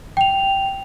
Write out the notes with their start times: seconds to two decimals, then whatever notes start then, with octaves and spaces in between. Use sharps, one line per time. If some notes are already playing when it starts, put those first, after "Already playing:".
0.17 G5 F7